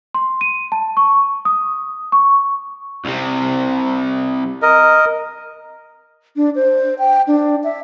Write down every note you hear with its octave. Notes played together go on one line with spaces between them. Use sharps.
C6
D#7
A5
C#6
D#6
C#6
C2 C3
A#4 D#5
D4
C5
G5
D4
E5